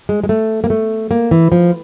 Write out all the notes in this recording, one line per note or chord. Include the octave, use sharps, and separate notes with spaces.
G#3
G#3
A3
A#3
A3
A#3
E3
F3